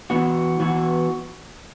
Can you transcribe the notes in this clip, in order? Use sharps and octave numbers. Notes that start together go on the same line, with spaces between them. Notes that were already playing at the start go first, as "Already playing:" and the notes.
E3 B3 F#4
E3 B3 F#4